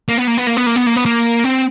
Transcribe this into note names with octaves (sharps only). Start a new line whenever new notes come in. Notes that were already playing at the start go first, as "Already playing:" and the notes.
A#3
B3
A#3
B3
A#3
B3
A#3
B3
A#3
B3
A#3
C4